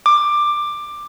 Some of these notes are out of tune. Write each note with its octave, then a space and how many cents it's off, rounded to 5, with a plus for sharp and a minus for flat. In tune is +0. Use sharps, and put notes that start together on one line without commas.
D6 +15